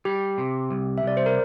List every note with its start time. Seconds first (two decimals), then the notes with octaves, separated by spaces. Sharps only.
0.05 G3 G4
0.38 C3
0.71 C2
0.98 E5
1.03 C2 D5
1.17 C5
1.26 A#4